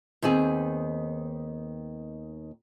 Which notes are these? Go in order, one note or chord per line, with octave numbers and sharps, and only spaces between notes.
D#2 D#3 B3 C4 G#4